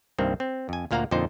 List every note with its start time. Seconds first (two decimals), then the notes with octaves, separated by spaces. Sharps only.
0.19 C2 G2 D#3 A#3 C4
0.40 C4
0.69 F2 G#5
0.91 D2 A#2 A#3 F5 F#5 A#5
1.11 F2 A#2 D3 D#4 C5